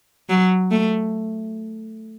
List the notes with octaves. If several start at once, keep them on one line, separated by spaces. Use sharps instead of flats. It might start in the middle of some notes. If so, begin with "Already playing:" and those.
F#3
A3